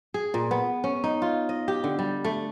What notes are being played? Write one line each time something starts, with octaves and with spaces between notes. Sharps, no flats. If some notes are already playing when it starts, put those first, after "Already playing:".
G#4
A#2
B3
C#4
D#4
F4
D#5
G4
D3
G3
A3